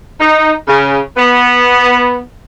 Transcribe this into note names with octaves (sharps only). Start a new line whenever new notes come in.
D#4
C#3
B3